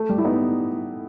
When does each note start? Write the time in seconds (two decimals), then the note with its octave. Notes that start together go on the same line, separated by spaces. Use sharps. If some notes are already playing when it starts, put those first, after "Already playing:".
Already playing: A3
0.09 G3
0.18 E4
0.24 B3 D#4